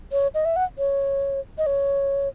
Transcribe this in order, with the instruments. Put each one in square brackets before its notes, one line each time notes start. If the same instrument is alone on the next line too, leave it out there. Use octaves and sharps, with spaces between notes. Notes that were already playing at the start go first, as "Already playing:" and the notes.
[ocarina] C#5
D#5
E5
F#5
C#5
D#5
C#5